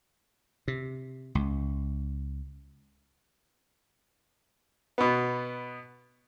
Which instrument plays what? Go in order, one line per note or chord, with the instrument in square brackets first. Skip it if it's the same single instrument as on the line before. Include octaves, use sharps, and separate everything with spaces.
[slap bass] C3
C#2
[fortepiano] B2 B3